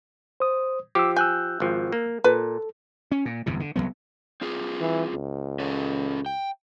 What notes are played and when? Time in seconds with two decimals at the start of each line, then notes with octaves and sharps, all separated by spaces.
0.40 C5 D#6
0.95 F3 G4 D6 E6
1.16 G#5 E6 F#6 G6
1.60 G#1 F3
1.92 A#3
2.24 A#2 A4 B4
3.12 C#4
3.25 A#2
3.46 G1 E2 G#2 C3
3.60 D3
3.76 C2 G2 F#3 B3
4.41 C4 F4 G#4
4.81 E3
5.14 C#2
5.59 C#4 A4
6.26 G5